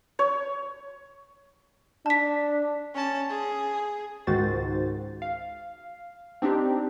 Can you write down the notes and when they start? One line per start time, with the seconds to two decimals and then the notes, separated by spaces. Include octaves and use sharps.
0.19 C#5
2.06 D4 A5 B6
2.95 C#4 A5
3.30 G#4
4.27 C#2 G#2 D#3 F#4 C5 A6
5.22 F5
6.42 C4 D4 D#4 G4